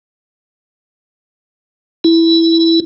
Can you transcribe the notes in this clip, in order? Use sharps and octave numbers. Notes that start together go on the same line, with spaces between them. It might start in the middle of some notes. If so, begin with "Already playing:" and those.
E4